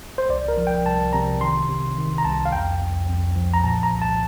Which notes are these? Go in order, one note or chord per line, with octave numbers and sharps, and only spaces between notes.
C5
C2 D5
A#4
F3
G5
C2 A5
C3 A#5
D#3 C6
C3
D#3
A#5
C2 A5
F5
F2 G5
F2
F2
F3
A#5
A#2 A5
A#5
C2
A5